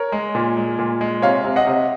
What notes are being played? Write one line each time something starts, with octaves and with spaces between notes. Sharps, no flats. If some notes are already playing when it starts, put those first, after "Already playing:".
Already playing: A#4 C#5
G#3
A#2
G#3
A#2
G#3
C3 C#5 F5
C3
D#5 F#5
C3